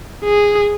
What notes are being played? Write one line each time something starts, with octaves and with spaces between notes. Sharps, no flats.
G#4